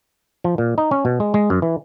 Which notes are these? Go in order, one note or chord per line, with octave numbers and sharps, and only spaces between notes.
F3
A#2
D#4
C#4
B2
G#3
G#3
F#2
E3